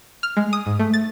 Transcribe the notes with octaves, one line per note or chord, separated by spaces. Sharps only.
F6
G#3
D#6
G#2
A3
A6